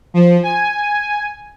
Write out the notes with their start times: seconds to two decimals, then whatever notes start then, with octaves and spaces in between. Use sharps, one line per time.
0.14 F3
0.43 G#5